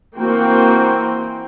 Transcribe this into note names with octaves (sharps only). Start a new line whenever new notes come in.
E3 A#3 C4 F#4 G5 C6